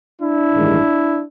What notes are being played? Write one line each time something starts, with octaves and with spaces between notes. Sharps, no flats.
D4 E4
A1 G2 D#3 G#3